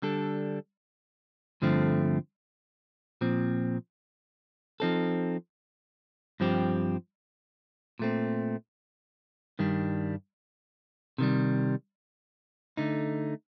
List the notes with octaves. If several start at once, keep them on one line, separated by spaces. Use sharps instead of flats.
D3 G3 D4 A4
G2 D3 F3 A3 C4
A#2 F3 C4
F3 C4 D#4 A4
G2 F3 C4 G4
A#2 A3 C4
G2 D#3 G3 D4
C3 D#3 G3
D3 A3 D#4